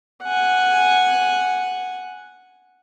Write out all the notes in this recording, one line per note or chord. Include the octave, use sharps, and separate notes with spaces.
F#5 G#5